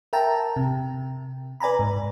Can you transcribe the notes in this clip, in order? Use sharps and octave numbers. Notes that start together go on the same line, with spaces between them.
A#4 E5 G5 A5 A#5
C3
B4 D5 G#5 A#5 B5
G#2